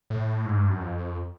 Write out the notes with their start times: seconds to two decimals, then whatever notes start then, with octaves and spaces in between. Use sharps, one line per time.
0.10 A2
0.46 G#2
0.57 G2
0.69 F#2
0.80 F2